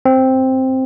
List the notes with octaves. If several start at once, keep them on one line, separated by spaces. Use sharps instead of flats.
C4